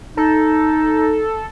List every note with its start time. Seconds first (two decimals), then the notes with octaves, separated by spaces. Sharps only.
0.17 D#4 A4